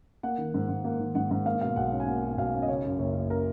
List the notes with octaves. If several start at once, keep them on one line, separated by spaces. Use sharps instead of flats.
A#3 F#5
D#3
G#2
G#2
A#3
D#3
G#2 F#5
G#2 F#5
A#3 F5
B2 F5
B1 F#5
C#4
G#5
A#3 F#5
B2
B1 F5
C#4
D#5
C#3 C#5
F#2
F#1 C#5
F#1
C#3 A#4